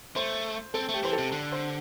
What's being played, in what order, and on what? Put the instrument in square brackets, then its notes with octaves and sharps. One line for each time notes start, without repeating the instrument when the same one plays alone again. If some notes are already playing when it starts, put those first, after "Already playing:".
[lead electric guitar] A3 [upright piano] C5
[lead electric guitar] C4 [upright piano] A4
[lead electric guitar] A3 [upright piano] G4
[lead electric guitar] E3 [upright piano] C5
[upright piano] A4
[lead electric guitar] C3
D3
[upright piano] C5